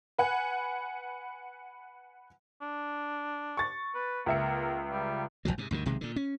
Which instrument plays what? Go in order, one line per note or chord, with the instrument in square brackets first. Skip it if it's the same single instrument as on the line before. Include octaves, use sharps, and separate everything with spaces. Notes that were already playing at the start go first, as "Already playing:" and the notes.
[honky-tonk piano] B4 F#5 G#5
[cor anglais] D4
[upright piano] C#6 A6
[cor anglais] B4
[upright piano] C#2 E5 C#7 [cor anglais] A#3
[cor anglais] G3
[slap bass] G#1 D2 F3 F#3
G#2 C3
D2 G2 D3 D#3
B1 C3 D#3 G#3
A#2 D3
C#4